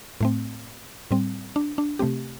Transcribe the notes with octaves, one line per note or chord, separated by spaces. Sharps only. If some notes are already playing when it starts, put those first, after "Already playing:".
A2 A3 C4
A2 G3 C4
D4
D4
C3 A3 C4 G4